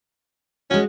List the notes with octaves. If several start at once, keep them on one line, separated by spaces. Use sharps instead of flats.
G#3 C#4 F#4